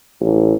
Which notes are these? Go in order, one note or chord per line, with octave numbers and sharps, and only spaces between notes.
A1